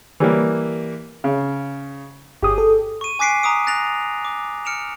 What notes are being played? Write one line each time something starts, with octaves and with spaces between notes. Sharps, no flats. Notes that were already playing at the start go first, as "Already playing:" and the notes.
E3 G3 A#3
C#3
G1 G4 G#4 D#6
A4
C#6 D#7
G#5 D6 F#6 B6 C7 D7
A#5 D6 D#6 D7
F#6 A6 A#6 D7 F7
D6
F6 C#7 D7 E7 F7